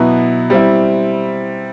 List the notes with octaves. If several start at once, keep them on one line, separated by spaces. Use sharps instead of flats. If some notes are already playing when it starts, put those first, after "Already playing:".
Already playing: B2 F#3 B3 E4
G3 C4 E4